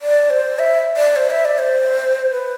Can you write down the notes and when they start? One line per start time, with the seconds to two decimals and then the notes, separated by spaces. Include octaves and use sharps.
0.02 D5
0.30 C5
0.59 E5
0.97 D5
1.16 C5
1.30 E5
1.45 D5
1.59 C5
2.31 B4